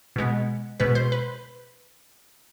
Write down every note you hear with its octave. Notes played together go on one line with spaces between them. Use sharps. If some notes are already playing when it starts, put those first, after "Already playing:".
B2 G#3 B3
B2 G#3 B3 B4
C5
B4